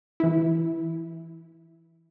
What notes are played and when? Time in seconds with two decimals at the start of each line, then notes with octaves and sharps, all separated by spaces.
0.20 E3 E4